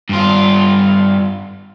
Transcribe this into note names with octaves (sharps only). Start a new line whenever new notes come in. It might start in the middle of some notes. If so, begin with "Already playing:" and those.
G2 F4